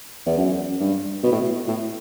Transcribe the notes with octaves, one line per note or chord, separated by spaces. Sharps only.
E2
F#2
G2
B2
A2
B2
A2